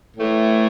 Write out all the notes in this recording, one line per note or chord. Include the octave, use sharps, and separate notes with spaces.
A2 E3 A3